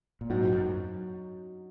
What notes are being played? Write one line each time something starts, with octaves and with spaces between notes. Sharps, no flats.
A#2
G#2 F#3 D#4 F#4
F#2